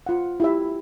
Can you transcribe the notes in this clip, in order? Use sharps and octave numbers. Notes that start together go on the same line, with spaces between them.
F4 F#5
E4 G4 E5